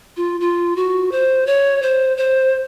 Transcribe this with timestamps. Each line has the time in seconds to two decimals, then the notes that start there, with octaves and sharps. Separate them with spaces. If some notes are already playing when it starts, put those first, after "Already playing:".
0.17 F4
0.40 F4
0.76 F#4
1.12 C5
1.47 C#5
1.82 C5
2.17 C5